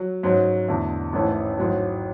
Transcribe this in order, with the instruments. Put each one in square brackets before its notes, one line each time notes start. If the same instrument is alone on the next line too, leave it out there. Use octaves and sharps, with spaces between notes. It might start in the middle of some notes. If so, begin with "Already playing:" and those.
Already playing: [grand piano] F#3
G#2 F#3 C#4
E2 D3 A3
A1 G#2 E3 A3 C#4
A1 G#2 F#3